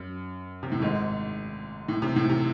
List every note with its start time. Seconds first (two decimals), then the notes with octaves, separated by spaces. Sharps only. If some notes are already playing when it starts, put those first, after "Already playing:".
Already playing: F#2
0.63 C3
0.72 A2
0.81 G#1 G#2
1.88 A2
2.02 C3
2.16 A2
2.29 C3